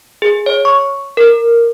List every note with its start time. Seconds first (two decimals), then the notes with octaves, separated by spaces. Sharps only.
0.22 G#4
0.46 C#5
0.65 C#6
1.17 A#4